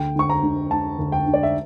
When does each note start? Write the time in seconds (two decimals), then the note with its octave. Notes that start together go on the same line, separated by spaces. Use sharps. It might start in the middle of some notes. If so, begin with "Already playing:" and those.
Already playing: D2 G5
0.16 D3 C#6
0.30 A#5
0.43 D3
0.71 D3 A5
0.99 D2
1.12 G5
1.26 D3
1.33 D5
1.43 E5